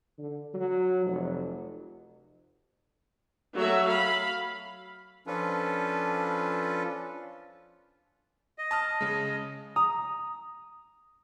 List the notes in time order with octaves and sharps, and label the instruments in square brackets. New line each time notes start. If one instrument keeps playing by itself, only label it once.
[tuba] D3
F#3
F1
[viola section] F#3 A3 F#4 E5
F5 B5
[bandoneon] F3 C#4 D4 F4 A4 B4
[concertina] D#5
[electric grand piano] A5 D#6 F6
C#3 G#3
[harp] A#5 D#6